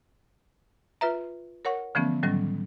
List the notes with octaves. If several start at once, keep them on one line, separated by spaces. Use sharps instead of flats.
F4 B4 E5 A#5
A#4 C#5 F#5 C#6
D3 E3 F3 A3 B3 C#4
A2 D#3 F#3 G3 C#4